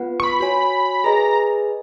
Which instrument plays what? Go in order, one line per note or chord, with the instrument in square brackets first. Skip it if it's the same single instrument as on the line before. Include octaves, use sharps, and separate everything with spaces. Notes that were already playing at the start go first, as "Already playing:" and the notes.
Already playing: [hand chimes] B3 F4 B4 F#5
[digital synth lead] C#6
B5
[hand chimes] F#4 C#5 G#5 [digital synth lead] B5
[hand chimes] G#4 B4 D#5 G#5 [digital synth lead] A#5